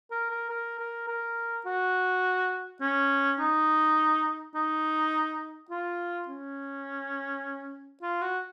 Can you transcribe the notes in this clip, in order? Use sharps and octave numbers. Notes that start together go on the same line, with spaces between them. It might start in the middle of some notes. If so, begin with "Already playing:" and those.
A#4
A#4
A#4
A#4
A#4
F#4
C#4
D#4
D#4
F4
C#4
F4
F#4